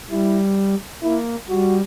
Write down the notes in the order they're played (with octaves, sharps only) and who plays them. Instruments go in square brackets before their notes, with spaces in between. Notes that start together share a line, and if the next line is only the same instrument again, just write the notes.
[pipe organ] G3 [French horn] E4
[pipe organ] A#3 [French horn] E4
[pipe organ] G3 [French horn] F#4